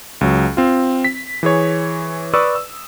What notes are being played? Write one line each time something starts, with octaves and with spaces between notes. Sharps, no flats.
C#2 F#3
C4 F4
B6
E3 G#4 C#5
B4 D5 C#6 D#6 E6
E6